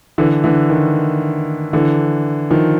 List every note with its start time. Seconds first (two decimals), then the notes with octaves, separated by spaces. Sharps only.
0.18 D3 E3
0.44 D3 E3
0.70 D#3
1.73 D3 E3
2.50 D#3 F3